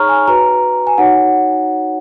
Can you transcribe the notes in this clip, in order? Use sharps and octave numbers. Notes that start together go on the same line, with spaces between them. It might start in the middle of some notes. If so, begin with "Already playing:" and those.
Already playing: D#4 G#4 C#5 A#5 C#6 F6
G#5
F#4 B4 A#5
G#5
D#4 F#4 C#5 F#5